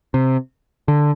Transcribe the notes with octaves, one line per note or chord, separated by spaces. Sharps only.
C3
D3